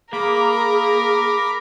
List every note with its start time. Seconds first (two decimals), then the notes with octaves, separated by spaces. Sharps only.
0.13 A#3 G#4 A#4 B5 D6